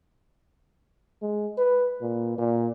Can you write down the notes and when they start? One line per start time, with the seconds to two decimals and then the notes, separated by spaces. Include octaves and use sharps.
1.22 G#3
1.58 B4
2.02 A#2
2.38 A#2